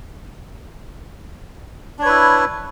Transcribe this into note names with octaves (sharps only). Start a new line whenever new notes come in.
D4 E4 B4 C#5